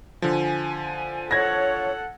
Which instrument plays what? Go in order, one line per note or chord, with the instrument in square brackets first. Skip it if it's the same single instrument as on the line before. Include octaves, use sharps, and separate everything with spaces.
[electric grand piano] D3 F3 [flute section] G#5
[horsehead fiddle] A4 F#5 [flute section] C#5 [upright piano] G#6 A#6